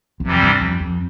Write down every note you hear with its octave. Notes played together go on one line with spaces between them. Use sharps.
E2
F2 C3 E3 G3 C4
G2
F2
F2